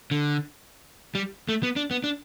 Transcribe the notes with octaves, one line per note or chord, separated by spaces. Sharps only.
D3
G3
A3
B3
D4
B3
D4